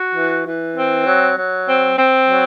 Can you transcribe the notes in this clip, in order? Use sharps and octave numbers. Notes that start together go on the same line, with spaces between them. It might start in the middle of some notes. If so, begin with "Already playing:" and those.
Already playing: F#4
E3
E3
C4
F#3
F#3
C4
C4
F#3